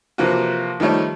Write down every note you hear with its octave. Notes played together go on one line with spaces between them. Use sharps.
C3 E3 F3 A#3 F4 F#4
D#3 F3 G3 A3 C#5